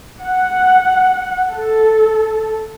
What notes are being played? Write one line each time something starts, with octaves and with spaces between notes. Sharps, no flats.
F#5
A4